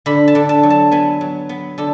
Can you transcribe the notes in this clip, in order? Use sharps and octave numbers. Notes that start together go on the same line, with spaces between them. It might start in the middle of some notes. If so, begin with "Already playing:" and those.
D3 B5
A5
D3
A5
F#3
A5
B3 G#5
F#3
B3
D3 A4